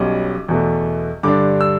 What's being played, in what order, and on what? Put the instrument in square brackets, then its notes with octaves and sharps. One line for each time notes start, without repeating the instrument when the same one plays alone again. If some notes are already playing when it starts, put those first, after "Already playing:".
Already playing: [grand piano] B1 B2 G3 C#4 D6
E2 B2 A3
G2 D3 G3 D4 D6
E6